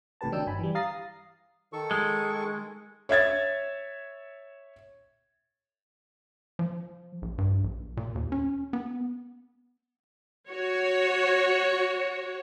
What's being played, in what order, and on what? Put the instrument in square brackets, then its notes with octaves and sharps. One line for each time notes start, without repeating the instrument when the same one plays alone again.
[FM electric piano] A1 A2 C3 G4 B4 A5
D#3 F#3 D4 D#4 G5 E6
G1 G#5 B5
E3 G3
F5 A#5 D#6 A6 A#6 C7
[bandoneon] D#3 A4 C#6
[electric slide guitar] G#3
[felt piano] C#5 E5 G#6 A6
[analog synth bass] F3
A#1
G2
A#1
A#2
D#2
C#4
B3
[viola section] F#4 C#5